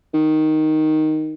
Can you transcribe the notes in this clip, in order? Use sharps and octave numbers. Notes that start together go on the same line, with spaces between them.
D#3